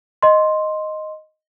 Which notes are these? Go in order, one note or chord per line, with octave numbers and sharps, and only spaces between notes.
D#5 C6